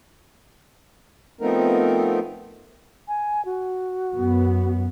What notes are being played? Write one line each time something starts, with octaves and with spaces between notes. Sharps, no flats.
F3 A3 B3 C4 D#4 A#4
G#5
F#4
F#2 B3